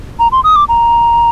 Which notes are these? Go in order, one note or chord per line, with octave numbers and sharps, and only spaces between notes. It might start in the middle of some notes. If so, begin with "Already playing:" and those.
A#5
C6
D#6
D6
A#5